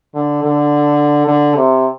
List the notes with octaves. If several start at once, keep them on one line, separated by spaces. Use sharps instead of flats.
D3
D3
D3
C3